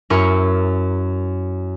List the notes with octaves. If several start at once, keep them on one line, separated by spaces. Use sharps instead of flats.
F#2 C#4 E4 A#4 C#6 C#7